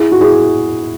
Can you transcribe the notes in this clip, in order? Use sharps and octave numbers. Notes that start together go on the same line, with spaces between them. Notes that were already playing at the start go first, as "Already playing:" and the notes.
Already playing: E4 G#4
F#4
E4 G#4